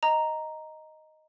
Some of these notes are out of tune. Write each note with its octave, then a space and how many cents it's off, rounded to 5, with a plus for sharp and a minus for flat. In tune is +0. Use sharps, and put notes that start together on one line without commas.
D#5 +0 A#5 +0